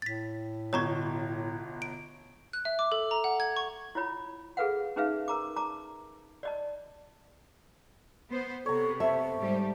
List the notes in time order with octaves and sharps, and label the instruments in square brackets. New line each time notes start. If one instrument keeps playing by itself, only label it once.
[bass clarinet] A2 [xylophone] A6 B6
[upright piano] G1 B2 G#6 [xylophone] C#5 A#5 C#6
[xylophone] D7
F#6
E5
D6
A4
A#5
F#5
G#6
C#6
[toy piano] E4 F4 C#5 B5
G#4 A4 B4 F5 F#5
C#4 D#4 G#4 B4 E5 F5
A#4 A#5 D6
A5 A#5 D6
D5 D#5 A5
[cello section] B3 C5
[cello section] C3 B3 [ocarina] A4 [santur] C#5 A#5
[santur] A3 [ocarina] C5 [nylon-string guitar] E5
[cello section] G#2 G3 G4